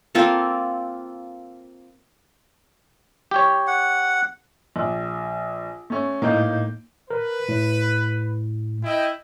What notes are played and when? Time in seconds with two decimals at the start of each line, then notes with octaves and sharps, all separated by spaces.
0.15 A#3 C4 F4 A4
3.31 G4 C#5
3.67 F#5
4.76 A#1
5.90 A3 C#4
6.22 A2 A#3 D#4 G6
7.10 A#4 B4
7.49 A2
8.84 E4 D#5 G5